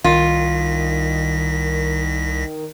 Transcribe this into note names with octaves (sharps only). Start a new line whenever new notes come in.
C2 D#3 F4 A#6 B6